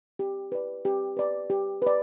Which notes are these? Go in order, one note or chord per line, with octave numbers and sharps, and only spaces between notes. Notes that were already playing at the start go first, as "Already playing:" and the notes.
G4
B4 D5
G4
B4 D5
G4
B4 D5